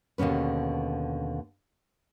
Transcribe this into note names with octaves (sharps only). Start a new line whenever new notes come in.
D#2 B2 D3 C#4 B4